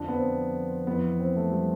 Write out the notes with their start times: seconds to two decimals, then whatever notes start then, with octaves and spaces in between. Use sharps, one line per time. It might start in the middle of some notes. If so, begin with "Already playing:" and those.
Already playing: F2 D3 F3 D4
0.08 B3
0.14 C4
0.87 F2 E3 B3
1.20 C4
1.36 A3
1.52 G3